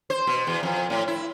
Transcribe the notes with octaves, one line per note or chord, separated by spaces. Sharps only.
C5
B2
E2
F2
A2
E4